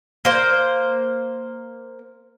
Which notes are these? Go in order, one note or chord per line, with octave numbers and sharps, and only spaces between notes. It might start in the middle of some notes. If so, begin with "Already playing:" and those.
A#3 C5